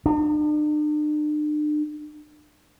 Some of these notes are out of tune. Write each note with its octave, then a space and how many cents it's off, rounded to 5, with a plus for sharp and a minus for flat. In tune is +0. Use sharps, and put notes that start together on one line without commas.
D4 +45